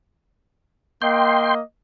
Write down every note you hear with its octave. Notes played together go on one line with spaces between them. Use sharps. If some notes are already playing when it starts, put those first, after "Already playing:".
A#3 D#5 G5 C6